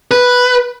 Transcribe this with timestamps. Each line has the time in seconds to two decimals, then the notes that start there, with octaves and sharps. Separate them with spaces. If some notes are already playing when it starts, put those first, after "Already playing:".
0.11 B4